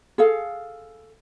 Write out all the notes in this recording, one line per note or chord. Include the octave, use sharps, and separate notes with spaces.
G#4 A4 F5